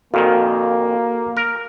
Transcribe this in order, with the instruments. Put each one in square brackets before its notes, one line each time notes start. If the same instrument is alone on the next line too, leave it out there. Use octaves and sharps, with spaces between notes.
[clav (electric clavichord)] F2 A#2 D#3 [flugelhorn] A#3 [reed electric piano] F#4 A4 F5
[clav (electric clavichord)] A#4